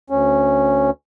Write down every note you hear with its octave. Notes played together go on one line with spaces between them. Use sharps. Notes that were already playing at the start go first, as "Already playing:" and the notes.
D2 C#4